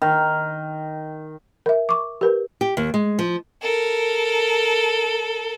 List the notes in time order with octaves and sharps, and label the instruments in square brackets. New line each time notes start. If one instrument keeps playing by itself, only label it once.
[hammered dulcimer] D#3
[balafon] A#4 E5
C#6 D6
G4 A#4 B4
[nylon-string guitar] G4
D#2
G#3
F3
[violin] A4 A#4